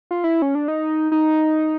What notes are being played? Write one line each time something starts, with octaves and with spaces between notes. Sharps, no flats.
F4
E4
C#4
D4
D#4
D#4